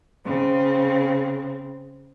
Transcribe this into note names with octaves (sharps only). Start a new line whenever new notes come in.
C#3 C4